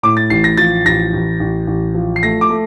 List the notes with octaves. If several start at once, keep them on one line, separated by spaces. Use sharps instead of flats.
A2 D6
A6
A1 C7
A#6
F3 A6
A1 A#6
A1
A1
A1
F3
C7
A3 A#6
D6
A3